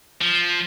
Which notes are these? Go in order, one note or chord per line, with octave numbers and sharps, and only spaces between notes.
F3